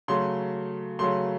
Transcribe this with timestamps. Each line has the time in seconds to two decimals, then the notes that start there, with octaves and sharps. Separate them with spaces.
0.08 C#3 F#3 A3 C6
0.99 C#3 F#3 A3 C6